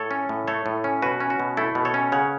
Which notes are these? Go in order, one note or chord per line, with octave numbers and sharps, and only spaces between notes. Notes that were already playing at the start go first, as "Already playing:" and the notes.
Already playing: A2 A4 C#5
C#4
A2
A3 A4 C#5
A2
C#4
B2 F#4 B4
C#4
F#4
B2
A3 E4 A4
B2
A4 C#5
C#4
C#3 C#5 F#5